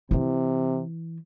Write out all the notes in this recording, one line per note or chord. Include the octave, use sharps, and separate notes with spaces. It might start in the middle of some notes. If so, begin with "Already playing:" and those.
C3 E3 E4